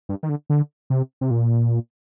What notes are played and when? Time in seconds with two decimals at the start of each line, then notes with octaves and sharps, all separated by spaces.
0.09 G2
0.23 D#3
0.29 D3
0.50 D3
0.90 C3
1.21 C3
1.31 A#2